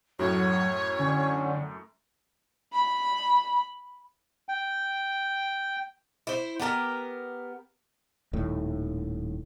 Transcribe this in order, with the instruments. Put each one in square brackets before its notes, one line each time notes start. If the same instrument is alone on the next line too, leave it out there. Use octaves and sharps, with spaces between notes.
[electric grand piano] F#2 A2 A3 [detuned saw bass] F#3 [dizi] C#5
[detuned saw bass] D3 [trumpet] C#4
[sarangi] B5
[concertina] G5
[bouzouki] E4 C5
B3 G4 A4 A#4
[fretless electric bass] D#1 D#2 A2